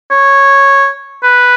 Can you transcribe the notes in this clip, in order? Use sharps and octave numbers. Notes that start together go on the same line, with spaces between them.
C#5
B4